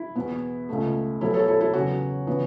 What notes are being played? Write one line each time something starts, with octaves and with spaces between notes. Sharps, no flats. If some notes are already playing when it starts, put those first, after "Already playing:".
Already playing: E4
E2 B2 B3
C#2 B2 A3
E2 B2 F#3 E4 A4
A4 C#5
E4 A4
E4 A4
E2 C#3 F#3 B3 F#4
C#3 E3 B3